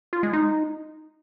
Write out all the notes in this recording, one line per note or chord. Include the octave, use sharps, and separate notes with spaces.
F4
G#3
D#4